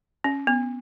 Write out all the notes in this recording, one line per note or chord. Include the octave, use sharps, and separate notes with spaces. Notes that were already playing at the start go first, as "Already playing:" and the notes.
C#4
B3